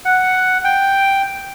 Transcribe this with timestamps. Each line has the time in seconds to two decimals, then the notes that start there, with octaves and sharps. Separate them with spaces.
0.05 F#5
0.64 G5